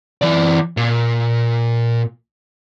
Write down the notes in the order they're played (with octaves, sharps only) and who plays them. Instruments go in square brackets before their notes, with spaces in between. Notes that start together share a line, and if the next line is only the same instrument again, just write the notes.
[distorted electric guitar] E3 D5
A#2